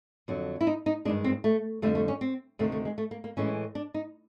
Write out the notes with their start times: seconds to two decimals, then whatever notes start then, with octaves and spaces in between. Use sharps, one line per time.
0.28 F2 D3 F#3
0.61 E4
0.67 D#4
0.86 D#4
1.05 G2 D#3 G#3 D4
1.24 C4
1.44 A3
1.82 F2 D3 G3 A3
1.95 A3
2.08 C#4
2.21 C4
2.59 D2 C3 D#3 A3
2.72 A3
2.85 G#3
2.98 A3
3.11 A#3
3.24 A#3
3.37 A2 E3 G#3 C#4
3.75 D4
3.94 D#4